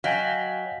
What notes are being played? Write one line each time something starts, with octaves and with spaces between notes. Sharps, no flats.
F#3 F#4 D#5 F5 G5 G#5 B6